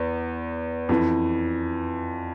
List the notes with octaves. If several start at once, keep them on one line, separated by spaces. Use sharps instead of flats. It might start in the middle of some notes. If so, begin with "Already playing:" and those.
Already playing: E2
F2 E3